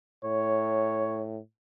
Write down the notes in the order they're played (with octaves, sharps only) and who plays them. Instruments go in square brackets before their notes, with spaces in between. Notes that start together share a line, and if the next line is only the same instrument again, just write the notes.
[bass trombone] A2 [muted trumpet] C#5